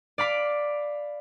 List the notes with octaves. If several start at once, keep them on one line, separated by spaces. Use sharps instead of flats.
D5 F5 B5 D6